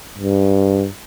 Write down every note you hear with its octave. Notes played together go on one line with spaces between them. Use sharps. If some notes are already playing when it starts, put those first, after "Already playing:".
G2